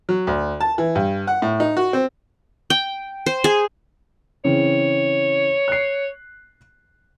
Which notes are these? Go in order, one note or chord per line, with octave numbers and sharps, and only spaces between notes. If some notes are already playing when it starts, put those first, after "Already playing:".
F#3
D2
A5
E3
G2
F#5
A2
D#4
F#4
C4
G5
C5
G#4
C#3 E3 C4 C#5
F#6 C7